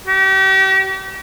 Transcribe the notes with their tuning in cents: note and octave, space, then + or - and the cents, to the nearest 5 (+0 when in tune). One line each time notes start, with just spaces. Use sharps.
G4 -40